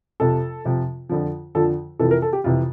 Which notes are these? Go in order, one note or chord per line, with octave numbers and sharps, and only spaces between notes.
F2 C3 F3 A4
F2 C3 F3
F2 D3 F3
F2 D3 F3 A4
F2 C3 E3 A4
A#4
A4
G4
F2 C3 E3 F4